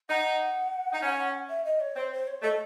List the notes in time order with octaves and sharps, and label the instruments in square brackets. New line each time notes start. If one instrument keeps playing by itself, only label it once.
[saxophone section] D#4 [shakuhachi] F#5
[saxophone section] D#4
C#4
[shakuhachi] E5
D#5
C#5
[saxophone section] C4 [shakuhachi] C5
[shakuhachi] C5
C#5
[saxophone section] A3 [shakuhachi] D#5